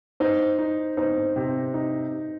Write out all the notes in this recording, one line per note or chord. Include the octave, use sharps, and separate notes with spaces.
D#4 C5
D#4
D#4 C5
C3
D#4